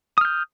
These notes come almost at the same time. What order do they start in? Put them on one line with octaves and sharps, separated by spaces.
D#6 F6 G6